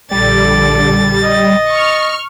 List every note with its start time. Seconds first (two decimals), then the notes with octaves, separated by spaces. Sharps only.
0.11 A#1 D3 G3 A4 D5 A6
1.23 D#5
1.70 C#6 F6